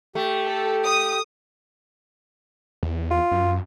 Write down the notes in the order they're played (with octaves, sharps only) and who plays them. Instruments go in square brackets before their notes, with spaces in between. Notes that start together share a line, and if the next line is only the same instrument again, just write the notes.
[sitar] A3 [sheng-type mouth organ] G4
[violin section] A4
D#6
[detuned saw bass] E2
[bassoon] F4
[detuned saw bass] F#2